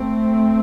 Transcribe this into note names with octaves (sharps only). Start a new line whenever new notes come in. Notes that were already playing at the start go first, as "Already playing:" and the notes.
Already playing: A3 C4